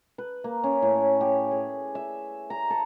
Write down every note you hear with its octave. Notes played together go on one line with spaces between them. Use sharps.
B4
A#3
C#4
A2
G4
G#4
E5
A#5
A4